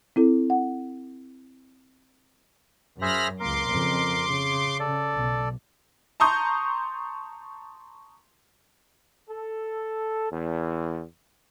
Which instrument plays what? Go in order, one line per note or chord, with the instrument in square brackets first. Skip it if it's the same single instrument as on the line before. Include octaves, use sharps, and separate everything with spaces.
[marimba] C4 E4 A4
F#5
[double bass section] F#2 [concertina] G#4 C5 E5 [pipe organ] B5 F6 A#6
[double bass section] C#2 A#3 [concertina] A#4 [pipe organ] C6 D6
[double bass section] F2 C#3
C#3
[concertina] A4 D5
[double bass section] B1 B2
[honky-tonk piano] A5 A#5 C6 C#6 D#6 G6
[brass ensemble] A4
E2